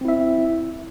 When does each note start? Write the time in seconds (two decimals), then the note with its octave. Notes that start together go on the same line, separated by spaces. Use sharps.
0.01 C4
0.05 E4
0.08 E5